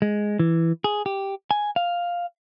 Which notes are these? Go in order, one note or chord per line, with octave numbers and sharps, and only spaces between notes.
G#3
E3
G#4
G4
G#5
F5